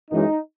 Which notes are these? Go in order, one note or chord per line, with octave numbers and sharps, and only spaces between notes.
F#2 E3 G#3 D#4